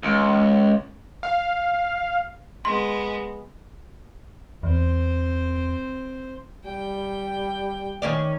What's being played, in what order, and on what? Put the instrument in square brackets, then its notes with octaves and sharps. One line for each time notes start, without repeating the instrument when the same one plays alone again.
[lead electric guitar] C#2
[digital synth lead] F5
[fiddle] G#3 B3 [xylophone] C6
[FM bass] E2 [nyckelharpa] C4 C5
[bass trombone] G3 [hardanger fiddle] G5
[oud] D#3 C#4 D5